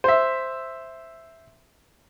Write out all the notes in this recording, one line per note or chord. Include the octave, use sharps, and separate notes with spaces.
C5 E5